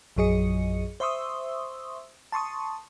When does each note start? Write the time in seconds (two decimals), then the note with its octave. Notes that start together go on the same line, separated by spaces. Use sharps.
0.17 A#1 F#2 F#3 G#4 D#5 C#7
1.00 C5 E5 C6 C#6 D#6 E6
2.32 A5 C6 C#6 D#6